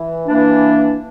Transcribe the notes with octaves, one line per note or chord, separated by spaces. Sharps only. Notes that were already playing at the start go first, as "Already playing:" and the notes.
Already playing: E3
E3 A#3 D4